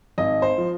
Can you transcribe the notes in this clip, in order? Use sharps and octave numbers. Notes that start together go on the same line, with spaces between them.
G#1 D#5
C5
F3